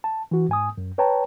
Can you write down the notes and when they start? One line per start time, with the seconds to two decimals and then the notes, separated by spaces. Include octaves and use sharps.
0.04 A5
0.31 E3 F#4
0.49 G#2 G#5 D#6
0.78 F#2
0.98 B4 C#5 G5 A5 A#5